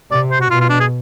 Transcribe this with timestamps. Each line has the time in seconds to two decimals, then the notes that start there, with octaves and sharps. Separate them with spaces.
0.11 C3 D5
0.31 C5
0.41 F#4
0.50 B2 F4
0.61 F4
0.70 D4
0.80 G#4